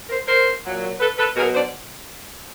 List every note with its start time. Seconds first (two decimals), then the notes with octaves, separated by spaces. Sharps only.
0.10 A#4 C5
0.27 A#4 C5
0.65 A#2 F#3
1.00 A4 B4
1.18 A4 B4
1.36 B2 F#3 G#4 A#4
1.55 C5 D5